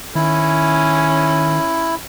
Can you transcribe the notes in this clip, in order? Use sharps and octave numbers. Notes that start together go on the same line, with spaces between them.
D#3 C#4 E4